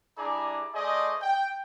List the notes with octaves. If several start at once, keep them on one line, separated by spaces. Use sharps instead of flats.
G3 D4 E4 G#4 D5 A#5
A3 G#4 C5 D5 D#5
G5